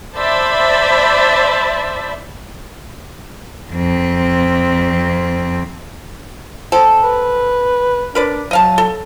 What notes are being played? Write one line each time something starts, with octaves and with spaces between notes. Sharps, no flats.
C5 D5 E5 A5 B5
F2 C4
C4 A4
B4
D4 A#4 B4 D5
F#3 D#5 F5 A5
A4